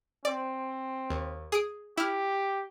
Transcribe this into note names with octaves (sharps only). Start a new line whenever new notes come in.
C4 D5
D#2
G#4 D#6 D7
E4 G4 F6